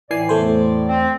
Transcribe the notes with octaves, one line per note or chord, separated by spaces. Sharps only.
A2 E3 D5 G#5 C7
E2 A3 C5
C4